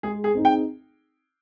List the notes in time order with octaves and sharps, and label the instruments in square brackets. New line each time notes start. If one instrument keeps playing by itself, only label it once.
[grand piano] G#3 [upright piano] G#4
[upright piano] G#4
[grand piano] C4 D#4 G#4
[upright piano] G5